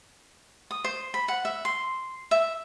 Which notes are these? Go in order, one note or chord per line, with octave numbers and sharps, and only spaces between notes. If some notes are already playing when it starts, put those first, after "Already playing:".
D#6
C5
B5
F#5
E5
C6
E5